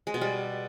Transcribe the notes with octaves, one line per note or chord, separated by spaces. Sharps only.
G#3
B2
G3